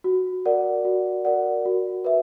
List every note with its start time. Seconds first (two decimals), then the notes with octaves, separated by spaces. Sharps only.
0.04 F#4
0.46 A#4 D5 F#5
0.85 F#4
1.25 A#4 D5 F#5
1.65 F#4
2.05 B4 E5